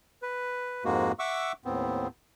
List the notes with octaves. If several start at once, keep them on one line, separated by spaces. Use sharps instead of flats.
B4
F2 G#2 G#3 A#3 F#4
E5 F#5 C#6 D6 E6
D#2 A2 B3 C4